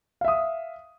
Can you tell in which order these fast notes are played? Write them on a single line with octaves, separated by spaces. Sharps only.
F5 E5 D#6